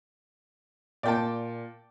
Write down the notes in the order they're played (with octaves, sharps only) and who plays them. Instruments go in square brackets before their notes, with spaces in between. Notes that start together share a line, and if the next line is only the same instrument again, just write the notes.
[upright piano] A#2 [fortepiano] D5 G5 A5